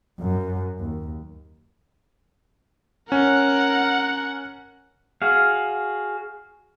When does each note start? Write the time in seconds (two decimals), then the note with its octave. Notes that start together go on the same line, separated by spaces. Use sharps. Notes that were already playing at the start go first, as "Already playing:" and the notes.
0.20 F#2
0.80 D#2
3.12 C#4 A#4 F#5
5.22 F#4 G#4 F5